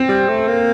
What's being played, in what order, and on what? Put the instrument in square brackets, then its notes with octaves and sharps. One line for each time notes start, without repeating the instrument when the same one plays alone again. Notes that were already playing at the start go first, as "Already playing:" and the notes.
Already playing: [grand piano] C4
[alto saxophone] G3
A3
A#3